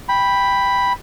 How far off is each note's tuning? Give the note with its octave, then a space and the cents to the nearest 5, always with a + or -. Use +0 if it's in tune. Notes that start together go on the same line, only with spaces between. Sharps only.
G5 +10 B5 +0